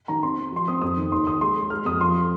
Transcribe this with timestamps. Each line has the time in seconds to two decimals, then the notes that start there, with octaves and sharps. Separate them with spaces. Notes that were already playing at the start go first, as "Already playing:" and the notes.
0.08 D#3 A#5
0.23 C4 C6
0.38 C4
0.52 F3 C6
0.68 C4 D#6
0.82 F2 D#6
0.97 D#3
1.11 D#2 C6
1.27 D#2 D#6
1.41 G#3 C6
1.56 G#3
1.70 G#3 F6
1.85 F2 D#6
2.00 F3 C6